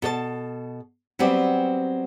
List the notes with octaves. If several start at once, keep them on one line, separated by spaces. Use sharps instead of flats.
B2 A4 C#5 A5
F#3 G3 B3 C4 D5